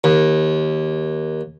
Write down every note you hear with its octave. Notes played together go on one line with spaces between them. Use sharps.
D#2